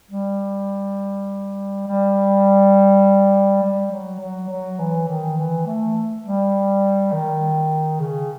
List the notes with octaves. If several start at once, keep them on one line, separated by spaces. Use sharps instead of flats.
G3
G3
G3
F#3
F#3
F#3
E3
D#3
E3
A3
G3
D#3
C#3